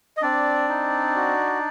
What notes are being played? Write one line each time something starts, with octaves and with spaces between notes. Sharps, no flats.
D#5
C4 D4 D5
D#4
F#4